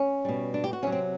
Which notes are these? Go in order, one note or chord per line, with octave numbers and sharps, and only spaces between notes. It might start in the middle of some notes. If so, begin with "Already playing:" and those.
Already playing: C#4
B2 G3
D4
G4
F#4
C3 D#3 F#3 C#4
C4